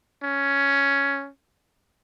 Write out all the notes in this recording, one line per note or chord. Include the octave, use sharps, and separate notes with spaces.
C#4